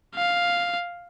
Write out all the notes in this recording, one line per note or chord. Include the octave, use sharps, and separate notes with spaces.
F5